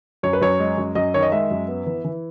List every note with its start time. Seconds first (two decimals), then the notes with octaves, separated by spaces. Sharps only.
0.23 F#2 C#5
0.33 B4
0.41 F#2 C#5
0.59 G#3
0.78 F#2
0.95 F#2 D#5
1.14 D#3 C#5
1.23 D#5
1.32 G#3 E5
1.51 F#2
1.68 B3
1.86 E3
2.05 E3